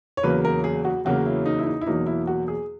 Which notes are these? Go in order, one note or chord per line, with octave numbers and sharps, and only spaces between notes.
C#5
E2 C#3 F#3 A#3 B4
A#4
G#4
F#4
E2 C#3 F#3 A#3 F#4
E4
D#4
E4
D#4
E4
E2 B2 F#3 A#3 D#4
E4
F#4
G#4